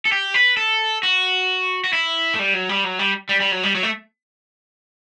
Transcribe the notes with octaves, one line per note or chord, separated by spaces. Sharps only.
A4
G4
B4
A4
F#4
F#4
E4
A3
G3
F#3
G3
F#3
G3
G3
G3
F#3
G3
F#3
A3